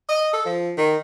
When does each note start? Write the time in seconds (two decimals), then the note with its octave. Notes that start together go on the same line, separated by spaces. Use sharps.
0.09 D#5
0.33 A4
0.46 F3
0.77 D#3